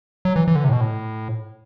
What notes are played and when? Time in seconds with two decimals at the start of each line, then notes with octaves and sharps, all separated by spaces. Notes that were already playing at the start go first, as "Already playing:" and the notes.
0.25 F#3
0.36 E3
0.48 E3
0.56 D3
0.64 C3
0.69 A2
0.73 B2
0.81 A2